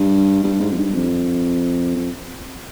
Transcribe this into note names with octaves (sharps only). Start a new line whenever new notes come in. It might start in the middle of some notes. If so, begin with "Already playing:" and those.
Already playing: G2
G2
G#2
F2
G2
F2
F2